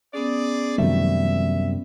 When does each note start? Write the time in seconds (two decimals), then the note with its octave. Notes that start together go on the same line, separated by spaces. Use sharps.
0.14 B3 C#4 G#4 D5
0.78 F#2 C3 D#3 F3 G3 A3 E5